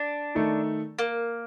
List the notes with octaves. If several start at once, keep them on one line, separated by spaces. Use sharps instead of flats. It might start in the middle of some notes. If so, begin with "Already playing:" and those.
Already playing: D4
D#3 A3 D#4 A4
A#3